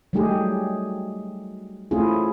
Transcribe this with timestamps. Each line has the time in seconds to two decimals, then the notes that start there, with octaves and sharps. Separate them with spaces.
0.13 F#3 G3 A3 D#4 G4 G#4
1.91 A3 C4 C#4 E4 F4 G#4